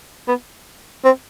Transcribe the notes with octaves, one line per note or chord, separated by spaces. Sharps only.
B3
C4